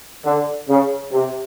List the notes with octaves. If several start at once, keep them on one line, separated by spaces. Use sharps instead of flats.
D3
C#3
C3